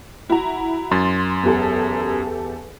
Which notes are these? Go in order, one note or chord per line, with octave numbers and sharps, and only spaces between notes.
E4 F#4 A#5
F#2 C6 A6
E2 G4 A4